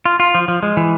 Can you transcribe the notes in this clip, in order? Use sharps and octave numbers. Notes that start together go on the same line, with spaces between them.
F4
F4
F3
F3
G#3
E3